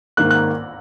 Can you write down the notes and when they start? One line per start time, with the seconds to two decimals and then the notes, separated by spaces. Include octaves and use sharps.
0.17 G#2 D#3 A#3 F#6
0.31 F#6